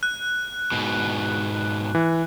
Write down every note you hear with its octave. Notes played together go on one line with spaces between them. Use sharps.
F#6
G#2 B2
E3